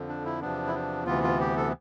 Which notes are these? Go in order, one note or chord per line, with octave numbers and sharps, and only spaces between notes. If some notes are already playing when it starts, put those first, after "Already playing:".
Already playing: F2 D3 F3
D4
E4
E2 C3 F3 B3 D4
E4
D4
D2 C3 E3 B3 F4
F4
G4
A4